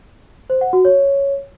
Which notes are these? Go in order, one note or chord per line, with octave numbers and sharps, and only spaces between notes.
C5
F#5
F#4
C#5